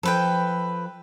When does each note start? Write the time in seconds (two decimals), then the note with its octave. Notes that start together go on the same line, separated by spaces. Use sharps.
0.03 F3 A4 B4 G5